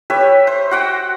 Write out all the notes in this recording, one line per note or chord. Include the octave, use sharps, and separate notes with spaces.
G4 B4 C#5 E5
C5
F#4 F#5 G5